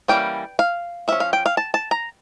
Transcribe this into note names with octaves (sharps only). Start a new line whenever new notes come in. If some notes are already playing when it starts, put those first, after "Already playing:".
E3 G3 A#3 C#4 G5
F5
F3 C#4 E5
F5
G5
F5
A5
A5
A#5